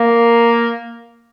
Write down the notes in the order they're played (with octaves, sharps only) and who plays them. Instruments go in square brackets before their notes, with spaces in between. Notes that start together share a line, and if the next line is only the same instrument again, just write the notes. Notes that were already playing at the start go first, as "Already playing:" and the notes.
Already playing: [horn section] A#3